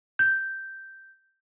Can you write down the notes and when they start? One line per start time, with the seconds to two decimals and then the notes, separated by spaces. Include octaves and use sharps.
0.19 G6